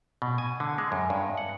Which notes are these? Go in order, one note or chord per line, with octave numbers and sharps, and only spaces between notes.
B2
G#5
D3
G#3
F#2
G2
F#5